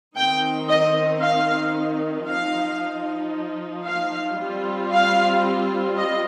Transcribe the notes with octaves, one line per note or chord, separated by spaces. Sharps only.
D#3 C4 D#4 G5
D#5
F5
F3 D#4 F5
F5
G3 C4 F4
F5
D#5